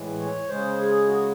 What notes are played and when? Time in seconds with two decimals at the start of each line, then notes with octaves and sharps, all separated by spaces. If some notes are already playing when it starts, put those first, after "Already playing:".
Already playing: A2 E3 G#3
0.19 C#5
0.49 C#3 G#3 C5
0.78 G#4
1.07 F#4